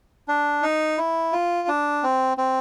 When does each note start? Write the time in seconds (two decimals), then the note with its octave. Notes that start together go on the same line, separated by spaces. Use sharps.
0.28 D4
0.63 D#4
0.98 E4
1.32 F4
1.68 D4
2.03 C4
2.37 C4